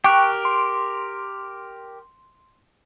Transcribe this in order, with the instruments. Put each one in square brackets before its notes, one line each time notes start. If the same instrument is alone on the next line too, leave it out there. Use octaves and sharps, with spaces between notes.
[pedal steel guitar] G4 A#4 [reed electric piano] G5 C#6 F#6
[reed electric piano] C6